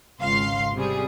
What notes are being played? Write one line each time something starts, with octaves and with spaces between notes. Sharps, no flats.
G#1 C#2 F5 C6 C7
C3 G3 G#4